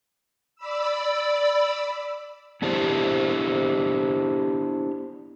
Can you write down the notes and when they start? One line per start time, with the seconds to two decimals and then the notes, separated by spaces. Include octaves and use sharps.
0.56 D5 B5 E6
2.62 B3 D4 E4 G4 C5